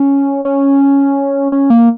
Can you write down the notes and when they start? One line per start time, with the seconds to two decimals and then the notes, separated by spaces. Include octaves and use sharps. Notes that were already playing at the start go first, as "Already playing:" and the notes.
Already playing: C#4
0.45 C#4
1.52 C#4
1.70 A#3